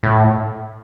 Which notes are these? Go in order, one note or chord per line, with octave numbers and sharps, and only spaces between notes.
A2